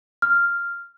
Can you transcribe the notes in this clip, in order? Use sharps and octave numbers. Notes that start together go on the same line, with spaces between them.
F6